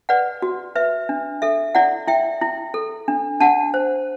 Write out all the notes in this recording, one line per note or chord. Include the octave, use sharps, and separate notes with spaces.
B4 D5 F#5
F#4
B4 E5
D4
A4 E5
E4 D5 F#5
E4 E5 G5
E4
A4
D4
D4 F#5 A5
C5